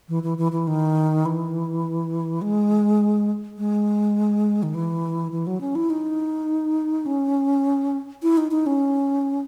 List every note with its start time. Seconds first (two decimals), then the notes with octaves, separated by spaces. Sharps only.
0.09 E3
0.23 E3
0.38 E3
0.52 E3
0.67 D#3
1.25 E3
2.41 G#3
3.58 G#3
4.63 D#3
4.74 E3
5.32 E3
5.47 F#3
5.61 C#4
5.75 E4
5.90 D#4
7.06 C#4
8.22 E4
8.37 D#4
8.51 D#4
8.66 C#4